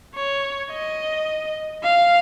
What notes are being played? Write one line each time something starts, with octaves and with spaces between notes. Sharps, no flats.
C#5
D#5
F5